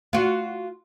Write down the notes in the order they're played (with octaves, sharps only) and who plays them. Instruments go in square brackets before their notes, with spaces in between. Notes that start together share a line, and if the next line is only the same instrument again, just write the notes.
[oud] F4 F#4